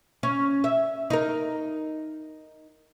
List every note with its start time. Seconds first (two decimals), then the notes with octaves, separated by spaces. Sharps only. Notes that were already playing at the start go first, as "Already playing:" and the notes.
0.23 C#4
0.64 E5
1.10 D#4 A#4